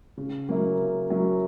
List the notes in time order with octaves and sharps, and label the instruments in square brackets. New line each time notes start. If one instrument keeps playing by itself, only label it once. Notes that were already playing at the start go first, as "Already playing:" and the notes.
[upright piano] C#3
F#3 A#3 C#4 E4
C#3
F#3 A#3 C#4 E4